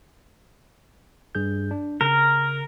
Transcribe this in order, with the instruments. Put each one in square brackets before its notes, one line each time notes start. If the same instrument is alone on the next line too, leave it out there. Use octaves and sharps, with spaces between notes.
[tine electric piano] G2 G#4 G6
D4
[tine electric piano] C#3 [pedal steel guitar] A#4